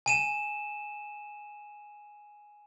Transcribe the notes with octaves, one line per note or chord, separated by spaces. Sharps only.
G#5 D#7 E7